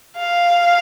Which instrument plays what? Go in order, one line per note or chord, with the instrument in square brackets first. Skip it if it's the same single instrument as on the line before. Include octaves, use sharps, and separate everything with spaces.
[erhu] F5